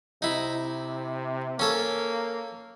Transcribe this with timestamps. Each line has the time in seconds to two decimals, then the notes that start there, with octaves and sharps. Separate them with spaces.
0.22 C3 D#4 E4
1.59 A#3 C#4 A4 C#5